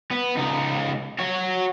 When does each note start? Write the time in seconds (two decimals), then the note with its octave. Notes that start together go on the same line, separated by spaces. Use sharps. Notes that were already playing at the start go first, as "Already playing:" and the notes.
0.11 B3
0.37 C#2 D#4
1.19 F#4 C#5